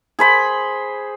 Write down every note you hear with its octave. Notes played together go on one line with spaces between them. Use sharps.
G#4 C5 B5